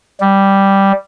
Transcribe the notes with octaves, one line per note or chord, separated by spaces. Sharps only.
G3